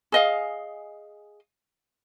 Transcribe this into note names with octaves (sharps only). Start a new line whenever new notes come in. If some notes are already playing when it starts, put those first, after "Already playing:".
G#4 D#5 F5